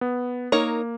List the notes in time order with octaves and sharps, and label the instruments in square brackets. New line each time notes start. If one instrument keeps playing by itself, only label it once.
[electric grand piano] B3
[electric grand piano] A#3 [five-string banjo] D#4 A#4 C#5